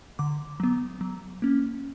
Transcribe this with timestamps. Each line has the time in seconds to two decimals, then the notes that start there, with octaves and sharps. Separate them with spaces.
0.19 D3 D6
0.60 F#3 B3
1.01 F#3
1.42 A#3 C#4